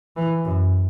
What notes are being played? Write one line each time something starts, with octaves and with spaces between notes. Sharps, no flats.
E3
F#2